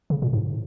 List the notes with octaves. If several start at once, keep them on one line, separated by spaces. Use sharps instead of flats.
C#3
A#2
G#2